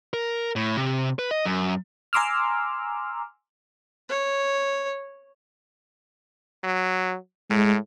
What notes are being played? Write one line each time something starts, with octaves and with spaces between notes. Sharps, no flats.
A#4
A2
C3
B4
D#5
F#2
G#5 A#5 C6 D6 E6 F6
C#5
F#3
A2 G#3